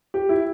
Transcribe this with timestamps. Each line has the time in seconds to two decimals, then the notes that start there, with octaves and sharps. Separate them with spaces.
0.14 G4
0.29 E4